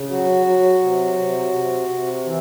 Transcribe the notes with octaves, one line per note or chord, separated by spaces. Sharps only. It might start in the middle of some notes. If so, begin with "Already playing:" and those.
Already playing: C#3
F#3 F#4
F#3
C3
C3
C3
C3
E3